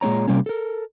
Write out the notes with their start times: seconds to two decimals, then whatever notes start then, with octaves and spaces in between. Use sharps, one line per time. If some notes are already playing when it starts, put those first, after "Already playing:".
0.01 A#2 G#3 C4 C#5 A#5
0.28 C3 G3 A#3 C#4
0.46 A4 A#4